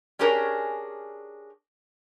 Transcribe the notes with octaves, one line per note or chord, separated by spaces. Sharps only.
C#4 D4 G4 G#4 A#4 C#5